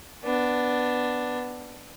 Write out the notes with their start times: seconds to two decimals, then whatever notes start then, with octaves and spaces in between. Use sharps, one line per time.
0.23 B3 D4